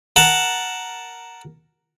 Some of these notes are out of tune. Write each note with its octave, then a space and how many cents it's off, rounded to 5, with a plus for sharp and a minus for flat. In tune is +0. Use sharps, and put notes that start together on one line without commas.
A#4 +0 F#5 +0 A5 +0